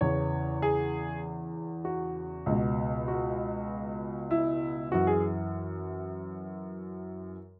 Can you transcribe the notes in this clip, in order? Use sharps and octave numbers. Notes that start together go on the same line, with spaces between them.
E2 C#3 E3 C#5
G#4
F#4
C#2 B2
F#4
E4
F#2 E3 F#4
G#4